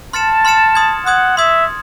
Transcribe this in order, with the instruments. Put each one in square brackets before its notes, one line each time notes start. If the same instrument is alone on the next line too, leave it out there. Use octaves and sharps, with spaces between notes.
[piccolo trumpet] A5 [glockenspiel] C6 F6 A6 C#7 E7
[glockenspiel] C6 F6 A6 C#7 E7
C6 D#6 G#6
[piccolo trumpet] F#5 [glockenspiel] C6 D#6 G#6
[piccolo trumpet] E5 [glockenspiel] C6 D#6 G#6